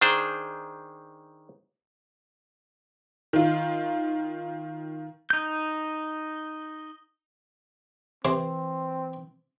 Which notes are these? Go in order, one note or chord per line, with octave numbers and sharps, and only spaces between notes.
D#3 D4 G#4 C5
D#3 F4
D#4 G6
C3 E3 C4 C5